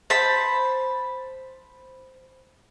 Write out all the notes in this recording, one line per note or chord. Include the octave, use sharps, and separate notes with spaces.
C5 A5 B5